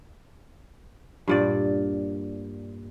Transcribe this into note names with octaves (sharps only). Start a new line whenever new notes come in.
G2 A#2 D5